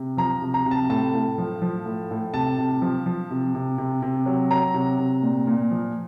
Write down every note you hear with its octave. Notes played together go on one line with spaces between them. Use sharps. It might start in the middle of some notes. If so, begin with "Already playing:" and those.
Already playing: C3
F3 A#5
C3
A#5
C3
A5
A2 A5
A2
F3
F3
A2
A2
C3 A5
C3
F3
F3
C3
C3
C3
C3
F#3
F#3 A#5
C3
C3
A#2
A#2
F3